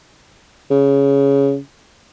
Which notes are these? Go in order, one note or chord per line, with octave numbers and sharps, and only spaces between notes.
C#3